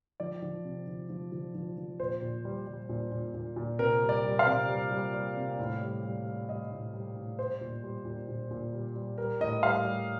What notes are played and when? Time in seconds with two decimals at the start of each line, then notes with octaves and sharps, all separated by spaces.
0.20 F3 D5
0.42 F3
0.65 C3
0.87 F3
1.09 F3
1.32 F3
1.55 F3
1.77 F3
2.00 A#2 C5
2.22 A#2
2.45 G3
2.67 G3
2.89 A#2
3.12 A#2
3.34 A#2
3.56 A#2
3.79 C3 A#4
4.02 G3
4.09 D5
4.24 G3
4.39 F5
4.47 C3
4.69 G3
4.91 G3
5.14 G3
5.37 C3
5.59 A2
5.81 G3
6.04 G3
6.26 G3
6.49 G3 D#5
6.71 A2
6.94 G3
7.16 A2
7.39 G3 C5
7.61 A#2
7.84 G3
8.05 A#2
8.28 A#2
8.51 A#2
8.73 G3
8.95 G3
9.18 G3 A#4
9.40 A2 D#5
9.63 G3 F5
9.85 G3